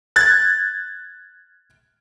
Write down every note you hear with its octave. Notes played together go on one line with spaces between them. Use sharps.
F#6 G#6 A6